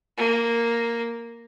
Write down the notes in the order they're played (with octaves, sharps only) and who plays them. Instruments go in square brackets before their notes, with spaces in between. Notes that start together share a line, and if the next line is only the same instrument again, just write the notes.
[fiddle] A#3